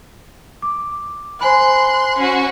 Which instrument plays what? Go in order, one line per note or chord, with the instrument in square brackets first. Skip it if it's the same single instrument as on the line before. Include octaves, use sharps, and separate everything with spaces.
[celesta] D6
[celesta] C5 G#5 B5 [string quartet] C6 F#6
[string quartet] C#4 F#4